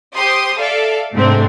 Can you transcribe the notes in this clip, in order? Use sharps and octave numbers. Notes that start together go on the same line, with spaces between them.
G4 C5 C6 D#6
A4 D5 E5 F5
G#2 C3 A3 C4 D4